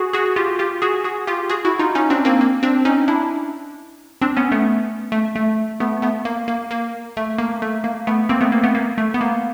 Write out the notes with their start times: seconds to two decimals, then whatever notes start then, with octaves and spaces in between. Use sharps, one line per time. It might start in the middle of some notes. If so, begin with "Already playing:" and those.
Already playing: F#4 G#4
0.13 F#4 G#4
0.36 F4 G4
0.59 F4 G4
0.82 F#4 G#4
1.04 F#4 G#4
1.27 F4 G4
1.50 F#4 G#4
1.65 E4 F#4
1.79 D#4 F4
1.95 C#4 D#4
2.10 C4 D4
2.25 A#3 C4
2.41 A#3
2.63 C4 D4
2.85 C#4 D#4
3.08 D4 E4
4.21 C4 D4
4.37 B3 C#4
4.51 A3 B3
5.12 A3
5.36 A3
5.80 A3 B3
6.02 A3 B3
6.25 A#3
6.48 A#3
6.71 A#3
7.17 A3
7.39 A#3
7.62 A3
7.84 A#3
8.07 A3 B3
8.29 A#3 C4
8.41 A3 B3
8.52 A#3
8.63 A3 B3
8.75 A#3
8.98 A3
9.14 B3
9.21 A#3